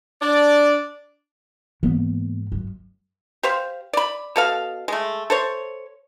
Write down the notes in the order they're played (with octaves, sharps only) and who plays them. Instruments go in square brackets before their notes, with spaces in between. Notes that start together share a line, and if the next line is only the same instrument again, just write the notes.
[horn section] D4 D5
[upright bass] G#2 [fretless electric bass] E3 A#3 B3
[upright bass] F#2
[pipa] G4 C5 F5
D5 B5
B2 A4 F5
G#3 A3
A4 C5 C#5